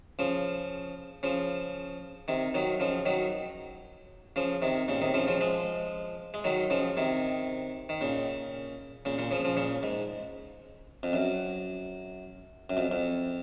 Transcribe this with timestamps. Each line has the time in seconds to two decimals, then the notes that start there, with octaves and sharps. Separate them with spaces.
0.19 C#3 F3
1.23 C#3 F3
2.28 C3 D#3
2.54 D#3 F#3
2.80 C#3 F3
3.05 D#3 F#3
4.36 C#3 F3
4.62 C3 D#3
4.88 A#2 C#3
5.01 C3 D#3
5.14 C#3 F3
5.27 C#3 F3
5.41 F3 G#3
6.34 G#3
6.44 D#3 F#3
6.70 C#3 F3
6.97 C3 D#3
7.89 D#3
8.01 A#2 C#3
9.05 A#2 C#3
9.18 A#2 C#3
9.31 C#3 F3
9.44 C#3 F3
9.57 A#2 C#3
9.83 G#2
11.03 F2
11.13 F#2
12.70 F#2
12.77 F2
12.91 F2